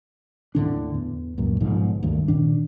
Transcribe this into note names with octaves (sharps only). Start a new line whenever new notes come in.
D#2 A2 D3 D4
E2
C#2 F#2 A#2
B1 G#2 D3 F3
D2 G2 D#3
A#2 D#3 D4